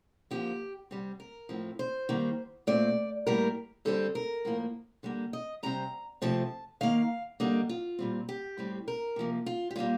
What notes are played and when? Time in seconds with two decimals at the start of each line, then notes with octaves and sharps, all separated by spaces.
0.31 D3 F3 A#3 G4
0.91 C3 G3 C4
1.20 A#4
1.49 A2 F3 C4
1.79 C5
2.09 D#3 G3 A#3
2.67 A#2 A3 C4 D5
3.27 A2 G3 A#3 A#4
3.85 D3 G3 C4 A4
4.15 A#4
4.45 A2 F3 A#3
5.03 D3 G3 A#3
5.33 D#5
5.63 C3 G3 C4 A#5
6.22 C3 F3 A3 C4 A5
6.81 D#3 A#3 F5
7.40 D3 G3 A#3 D#5
7.69 F4
7.99 A#2 G3 C4
8.29 G4
8.58 A2 G3 C4
8.88 A#4
9.16 C3 F3 A#3
9.46 F4
9.71 G4
9.76 A#2 G3 A#3 F4